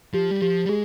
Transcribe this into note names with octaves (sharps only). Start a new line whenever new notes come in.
F3 G4
G3
F3 G4
G3
G#3 G#4